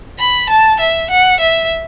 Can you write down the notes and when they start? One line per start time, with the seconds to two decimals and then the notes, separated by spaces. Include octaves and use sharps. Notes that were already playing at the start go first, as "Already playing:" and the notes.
0.19 B5
0.49 A5
0.80 E5
1.10 F#5
1.40 E5